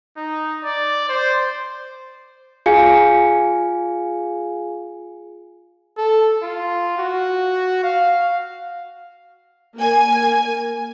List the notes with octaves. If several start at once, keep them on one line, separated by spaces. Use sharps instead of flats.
D#4
D5
C5
F4 G#4 F5 G#5 C#7
A4
F4
F#4
F5
A#3 G#5